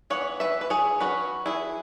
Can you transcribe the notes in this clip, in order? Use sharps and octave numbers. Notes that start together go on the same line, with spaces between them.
E3 B3 C#5 F#5
B4 E5
B4
G#4 C#5
F#3 C#4 F#4 B4
E4 G#4